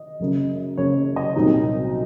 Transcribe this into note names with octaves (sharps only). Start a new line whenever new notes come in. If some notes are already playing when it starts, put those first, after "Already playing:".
Already playing: D#5
F#1 F#2 C#3
F#1 F#2 C#3 C#5
D#5
C2 A#2 F#3 C4 D#4